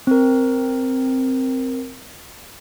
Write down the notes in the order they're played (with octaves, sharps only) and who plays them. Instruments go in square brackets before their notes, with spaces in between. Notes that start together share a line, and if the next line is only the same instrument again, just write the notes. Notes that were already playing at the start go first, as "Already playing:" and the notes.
[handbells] C4 A#4